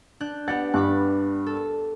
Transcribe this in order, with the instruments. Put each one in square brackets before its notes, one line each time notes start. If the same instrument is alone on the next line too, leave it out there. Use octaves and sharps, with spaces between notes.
[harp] D4 F#6 G6
[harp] B3 G4 F#5 [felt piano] A6
[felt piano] G2 [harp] B5 D6 F#6
[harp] A4